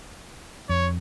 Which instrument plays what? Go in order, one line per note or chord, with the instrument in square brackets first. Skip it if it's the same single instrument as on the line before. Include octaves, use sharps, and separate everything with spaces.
[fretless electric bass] F2 [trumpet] C#5